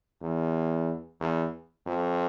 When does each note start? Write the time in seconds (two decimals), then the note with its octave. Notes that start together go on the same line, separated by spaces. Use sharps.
0.22 E2
1.20 E2
1.86 F2